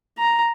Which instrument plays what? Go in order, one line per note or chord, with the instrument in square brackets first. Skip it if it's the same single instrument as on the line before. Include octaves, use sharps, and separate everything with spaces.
[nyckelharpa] A#5